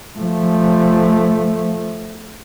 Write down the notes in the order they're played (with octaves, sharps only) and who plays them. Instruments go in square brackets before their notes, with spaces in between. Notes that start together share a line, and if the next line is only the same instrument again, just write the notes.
[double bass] F3 A3